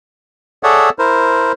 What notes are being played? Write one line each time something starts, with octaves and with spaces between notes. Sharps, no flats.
G#4 A4 C#5 D5 E5 F#5
E4 A#4 C5